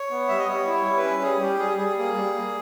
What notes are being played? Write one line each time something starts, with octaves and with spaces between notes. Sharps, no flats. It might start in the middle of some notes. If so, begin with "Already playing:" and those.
Already playing: C#5
B3
G3 E5
D#5
G3 C#5
E4
C#5
G3
B4
C#4
G3 G#4
G3 G4
G3 G#4
G3 G#4
A#3 G#4
G3
A#3